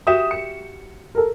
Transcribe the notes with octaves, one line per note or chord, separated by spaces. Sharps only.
F#4 G4 E5 D#6 E7
C#7
A4 A#4